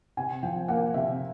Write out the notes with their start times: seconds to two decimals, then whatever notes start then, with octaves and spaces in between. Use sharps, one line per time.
0.17 C3 G#5
0.43 F3 G5
0.68 A#3 F#5
0.94 C3 E5